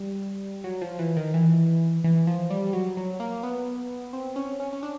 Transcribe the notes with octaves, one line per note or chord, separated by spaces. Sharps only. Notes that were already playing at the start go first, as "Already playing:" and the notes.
Already playing: G3
F#3
F3
E3
D#3
E3
E3
F3
G3
F#3
F#3
A#3
B3
C4
C#4
C#4
C#4
D4